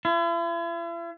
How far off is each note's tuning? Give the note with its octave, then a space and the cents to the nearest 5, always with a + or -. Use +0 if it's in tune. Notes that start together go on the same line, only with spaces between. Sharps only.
E4 +45